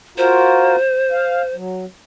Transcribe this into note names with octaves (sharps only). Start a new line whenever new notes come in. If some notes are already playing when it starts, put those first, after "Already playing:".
F4 F#4 A#4 C5
F5
F#3